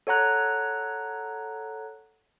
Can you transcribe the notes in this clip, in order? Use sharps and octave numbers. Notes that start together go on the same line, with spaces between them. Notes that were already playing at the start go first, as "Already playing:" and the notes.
A4 C#5 F#5 A#5 F#6